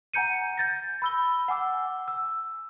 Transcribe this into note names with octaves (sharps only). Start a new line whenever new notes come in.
F#5 G#5 A#5 G6 C#7 D#7
G6 A6 A#6
B5 E6 G7
F#5 G#5 D6 E6
E6